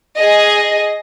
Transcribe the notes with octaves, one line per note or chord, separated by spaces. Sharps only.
G#4 D#5